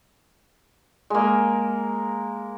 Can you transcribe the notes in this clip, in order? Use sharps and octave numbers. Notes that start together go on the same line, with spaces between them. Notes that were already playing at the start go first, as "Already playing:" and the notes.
G#3 A#3